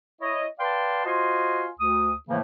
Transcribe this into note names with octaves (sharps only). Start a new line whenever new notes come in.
E4 C#5 D#5
B4 D5 F5 G5 A5 C6
F4 F#4 C5 D#5 G#5 C6
D2 D#6
A2 C#3 E3 F3 A3 A#3